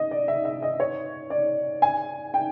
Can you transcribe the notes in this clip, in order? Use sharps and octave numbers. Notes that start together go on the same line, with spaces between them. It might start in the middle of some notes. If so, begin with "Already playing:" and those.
Already playing: D#5
D5
E5
E5
D#5
C#5
D5
G#5
G5